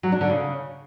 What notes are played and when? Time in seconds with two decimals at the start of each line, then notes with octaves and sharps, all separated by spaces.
0.03 F#3
0.12 D4
0.21 D3
0.30 C#3